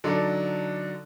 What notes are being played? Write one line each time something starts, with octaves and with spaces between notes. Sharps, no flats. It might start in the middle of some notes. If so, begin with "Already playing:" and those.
D3 F#3 D4 D#4 A4